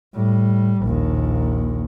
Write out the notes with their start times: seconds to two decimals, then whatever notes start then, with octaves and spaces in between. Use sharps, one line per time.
0.15 A2 G3
0.82 A#1 D#2